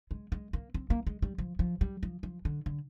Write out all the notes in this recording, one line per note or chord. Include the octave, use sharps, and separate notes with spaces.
G#3
G#3
A#3
C4
A#3
G#3
G3
F3
F3
G3
F3
F3
D3
D3